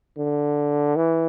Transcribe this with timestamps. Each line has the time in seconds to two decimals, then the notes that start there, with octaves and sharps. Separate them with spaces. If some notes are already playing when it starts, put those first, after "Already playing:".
0.18 D3
0.96 E3